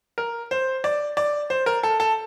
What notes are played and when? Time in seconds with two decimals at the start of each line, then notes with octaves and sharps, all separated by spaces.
0.18 A#4
0.51 C5
0.84 D5
1.17 D5
1.50 C5
1.66 A#4
1.83 A4
2.00 A4